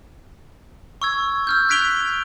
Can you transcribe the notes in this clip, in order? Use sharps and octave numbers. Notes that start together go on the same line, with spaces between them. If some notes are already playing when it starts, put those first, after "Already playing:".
C#6 E6 G#6
E6 F6 G6
F#6 G#6 B6 D7 F7 G7